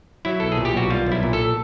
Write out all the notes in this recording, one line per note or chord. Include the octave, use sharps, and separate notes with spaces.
F#3 E4
B1 A4
G#4
A#2
G4
B1 F#4
G3 F4
B1 E4
A#2
A4